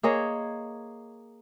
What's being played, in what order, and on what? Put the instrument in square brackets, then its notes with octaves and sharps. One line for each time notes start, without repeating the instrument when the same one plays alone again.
[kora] A#3 G#4 C#5 D#5